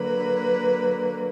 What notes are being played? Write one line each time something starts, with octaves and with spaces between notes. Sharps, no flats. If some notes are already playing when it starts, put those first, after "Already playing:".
Already playing: D3 F#3 A#3 B4